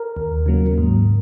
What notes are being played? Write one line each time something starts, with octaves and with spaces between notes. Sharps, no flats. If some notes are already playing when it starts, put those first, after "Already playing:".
Already playing: A#4
D#2
C#3 F#3 A#3
G#2